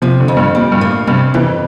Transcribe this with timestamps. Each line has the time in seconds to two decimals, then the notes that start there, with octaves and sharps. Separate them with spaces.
0.02 C3 F3
0.20 D3
0.28 F2
0.37 G2
0.55 A#2 G3
0.72 G2
0.81 A2 A#3
1.07 G2 C3
1.34 F2 E3